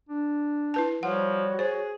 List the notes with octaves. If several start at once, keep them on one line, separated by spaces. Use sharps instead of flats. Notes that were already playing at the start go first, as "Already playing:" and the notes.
D4
E4 B4 A5
F3 G3 F#4 C#5 F#5
G#4 C5